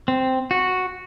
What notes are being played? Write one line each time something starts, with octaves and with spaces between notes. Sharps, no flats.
C4
F#4